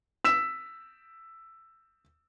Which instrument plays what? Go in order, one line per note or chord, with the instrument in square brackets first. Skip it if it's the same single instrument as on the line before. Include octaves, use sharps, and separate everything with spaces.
[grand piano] E6 B6 E7